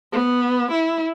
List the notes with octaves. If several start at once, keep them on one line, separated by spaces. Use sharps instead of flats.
B3
E4